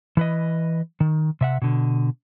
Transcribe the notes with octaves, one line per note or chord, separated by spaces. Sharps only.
E3 B4 D#5
D#3
C3 E5 F#5
B2 D3